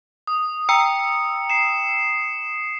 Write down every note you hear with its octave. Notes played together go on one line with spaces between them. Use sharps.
D#6
G5 A#5 E6 C#7
C7 E7